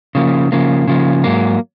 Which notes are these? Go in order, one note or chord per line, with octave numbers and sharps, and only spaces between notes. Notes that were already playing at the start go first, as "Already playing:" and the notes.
C#3 F3 A#3
C#3 F3 A#3
C#3 F3 A#3
G#2 F#3 A#3